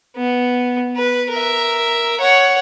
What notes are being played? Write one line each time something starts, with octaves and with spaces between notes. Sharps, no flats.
B3
B4
A#4 E5
C#5 F#5